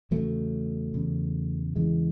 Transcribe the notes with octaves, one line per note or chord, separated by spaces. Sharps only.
E2 C#3 F#3 A3
E2 C#3
E2 C#3 E3 G#3